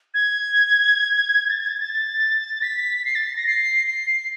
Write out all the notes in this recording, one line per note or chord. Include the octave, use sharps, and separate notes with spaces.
G#6
A6
G#6
A6
A6
B6
C7
A6
A#6
C7
C7